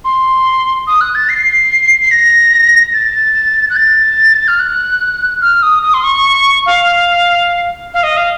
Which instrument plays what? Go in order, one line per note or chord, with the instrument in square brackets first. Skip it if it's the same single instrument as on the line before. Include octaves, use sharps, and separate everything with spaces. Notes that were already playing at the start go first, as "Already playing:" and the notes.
[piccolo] C6
D#6
F#6
A6
C7
C7
A#6
A6
F#6
A6
F6
F#6
F6
D#6
D#6
C6
C#6
F5
F5
D#5
F5